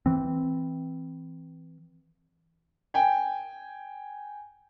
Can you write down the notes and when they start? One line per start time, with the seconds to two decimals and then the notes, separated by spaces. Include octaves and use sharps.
0.06 E3 C4
2.94 G5 G#5